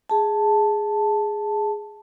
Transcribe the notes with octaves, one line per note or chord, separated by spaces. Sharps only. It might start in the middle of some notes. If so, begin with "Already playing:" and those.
G#4 A5